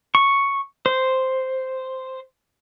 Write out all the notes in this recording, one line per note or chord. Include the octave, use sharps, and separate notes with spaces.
C#6
C5